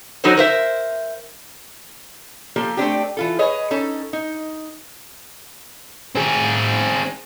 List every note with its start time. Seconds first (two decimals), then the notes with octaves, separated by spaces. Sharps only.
0.24 F#3 D#4 F#4 A4 C5
0.37 A#4 C5 E5
2.56 F3 A#3 G4 A4 F5
2.77 A3 C4 D4 G4
3.17 E3 F4 A4
3.39 G#4 B4 C#5 D#5
3.71 C#4 D#4 A4
4.13 D#4
6.15 C4 G#4